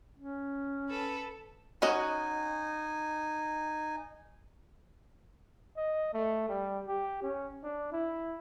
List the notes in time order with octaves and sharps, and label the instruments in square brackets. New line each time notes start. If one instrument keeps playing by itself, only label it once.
[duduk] C#4
[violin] A4 B4
[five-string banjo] C#4 F#4 D#5 [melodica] D#4 G#5
[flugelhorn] D#5
A3
G3
G4
C#4
D4
E4